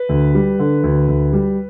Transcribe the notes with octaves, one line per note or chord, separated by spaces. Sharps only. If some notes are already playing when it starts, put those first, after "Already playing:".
Already playing: B4
D2
G3
D3
D2
D2
G3